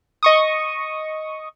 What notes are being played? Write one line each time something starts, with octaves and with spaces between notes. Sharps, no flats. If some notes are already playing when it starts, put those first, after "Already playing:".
D#5 C#6 D#6